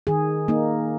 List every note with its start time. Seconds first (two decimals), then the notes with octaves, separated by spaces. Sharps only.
0.07 D#3 G#4
0.48 A#3 D#4